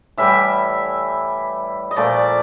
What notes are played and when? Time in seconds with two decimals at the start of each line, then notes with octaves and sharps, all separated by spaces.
0.17 A2 E3 G3 E5
1.91 D#5
1.96 A#2 F3 A3 D5